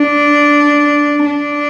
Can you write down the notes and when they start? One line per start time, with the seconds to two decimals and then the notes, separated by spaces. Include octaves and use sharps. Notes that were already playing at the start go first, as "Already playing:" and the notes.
Already playing: D4
1.25 D4